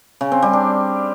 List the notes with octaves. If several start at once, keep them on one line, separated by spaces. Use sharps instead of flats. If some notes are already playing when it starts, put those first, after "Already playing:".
C#3
C4
G3
D4